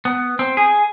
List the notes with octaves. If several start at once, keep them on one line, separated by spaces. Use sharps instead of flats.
B3
C4
G#4